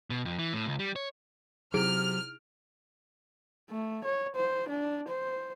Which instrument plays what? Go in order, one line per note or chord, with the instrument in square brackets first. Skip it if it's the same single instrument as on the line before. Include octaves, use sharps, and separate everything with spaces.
[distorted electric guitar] B2
F2
E3
A2
C#2
G3
C#5
[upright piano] C3 D7 [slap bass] F#3 [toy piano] D#4 E4 G#4 [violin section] F6
[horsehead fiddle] A3
C#5
C5
D4
C5